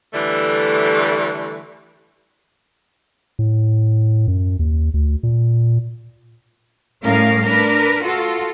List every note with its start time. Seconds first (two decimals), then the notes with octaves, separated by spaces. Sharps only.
0.14 D3 E3 G3 A3
3.39 A2
4.28 F#2
4.59 D#2
4.94 D2
5.23 A#2
7.04 A2 G3 C#4 A#4 F5
7.45 D4 A#4 B4
8.04 F4 F#4 A4